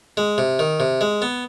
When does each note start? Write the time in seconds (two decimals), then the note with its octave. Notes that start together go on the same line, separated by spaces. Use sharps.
0.17 G#3
0.38 C3
0.59 D#3
0.80 C3
1.01 G#3
1.22 B3